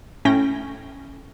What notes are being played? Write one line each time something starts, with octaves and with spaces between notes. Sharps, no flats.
A2 C#4 G5 A#6